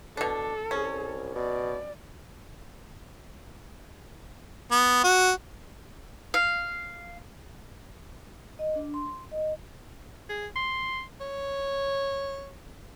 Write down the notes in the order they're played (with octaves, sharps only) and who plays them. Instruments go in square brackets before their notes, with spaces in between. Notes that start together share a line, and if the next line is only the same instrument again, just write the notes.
[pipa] B2 D4 [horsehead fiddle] A4
[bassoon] C2 [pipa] C#4
[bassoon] B2 [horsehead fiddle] D5
[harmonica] B3
F#4
[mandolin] F5
[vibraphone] D#5
D4
C6
D#5
[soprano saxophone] G#4
C6
C#5